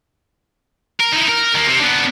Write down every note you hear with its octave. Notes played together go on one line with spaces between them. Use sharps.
A#4
D#4 E4
A#4
D#3 A#3
C3
B3 D4